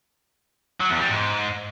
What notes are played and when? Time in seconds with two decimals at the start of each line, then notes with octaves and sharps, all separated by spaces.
0.80 F#3
0.90 E2
1.00 G3
1.09 G#2